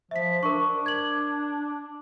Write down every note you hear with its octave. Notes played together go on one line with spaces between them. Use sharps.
F3 E5 B6
D4 A#4 C#6
G#6 F#7